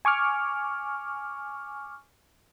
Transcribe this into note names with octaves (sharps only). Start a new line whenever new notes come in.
G#5 C#6 D6 F6